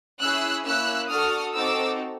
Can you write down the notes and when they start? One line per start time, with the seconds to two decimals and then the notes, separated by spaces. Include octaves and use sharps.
0.20 C#4 E4 G#4 E6 F#6
0.65 A#3 C#4 E4 E6 F#6
1.10 D4 F#4 A4 D#6 F6
1.54 C4 D#4 F#4 A4 D6 E6